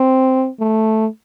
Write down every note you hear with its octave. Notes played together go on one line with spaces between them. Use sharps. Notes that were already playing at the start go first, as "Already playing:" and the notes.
Already playing: C4
A3